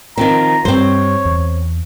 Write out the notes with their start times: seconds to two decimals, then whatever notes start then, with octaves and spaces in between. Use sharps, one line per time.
0.18 D#3 F3 C4 A#5
0.65 G2 G3 C4 C5 C#5
1.25 E2